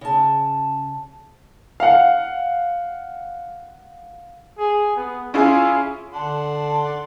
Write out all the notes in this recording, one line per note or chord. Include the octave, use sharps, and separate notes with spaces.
C#3 A5
F5 F#5
G#4
B3
C#4 E4 F4 G#4
D3 D5 F#5 A5 C6